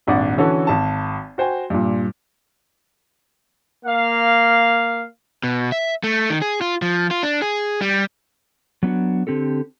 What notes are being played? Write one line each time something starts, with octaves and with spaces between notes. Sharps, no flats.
D#1 G#1 D4 D5 F#5
D3 E3 C#4 F#4 A4
G#1 A5
F#4 C5 G5 G#5
G2 A#2
A#3 F5
B2
E5
A3
D#3
G#4
F4
F3
F4
D4
G#4
G3
F#3 B3 D4 F#4
D3 C4 G4 A4